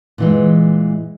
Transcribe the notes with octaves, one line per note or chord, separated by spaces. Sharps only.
A#2 E3 G#3